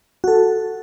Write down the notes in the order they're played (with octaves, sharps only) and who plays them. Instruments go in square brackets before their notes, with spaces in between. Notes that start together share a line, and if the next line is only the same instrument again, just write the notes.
[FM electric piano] F#4 A4